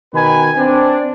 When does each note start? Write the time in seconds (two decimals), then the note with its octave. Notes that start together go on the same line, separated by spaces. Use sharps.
0.14 B2 D#3 B4 G#5 B5
0.57 C4 D4